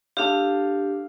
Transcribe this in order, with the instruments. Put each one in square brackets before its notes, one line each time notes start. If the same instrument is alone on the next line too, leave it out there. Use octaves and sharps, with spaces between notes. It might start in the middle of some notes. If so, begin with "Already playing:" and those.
[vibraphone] D4 G4 [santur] A4 F5